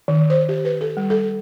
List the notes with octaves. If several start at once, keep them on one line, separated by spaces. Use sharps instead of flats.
D#3
C5
G4
B4
A4
G3
A4